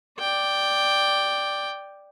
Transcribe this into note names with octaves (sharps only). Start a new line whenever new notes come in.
D5 G5